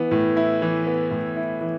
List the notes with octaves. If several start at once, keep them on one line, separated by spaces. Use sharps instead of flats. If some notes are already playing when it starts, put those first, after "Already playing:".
Already playing: E3 B3
A2
E4
E3
B3
A2
E4
E3